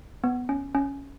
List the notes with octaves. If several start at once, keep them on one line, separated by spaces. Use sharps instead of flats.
B3
C#4
C#4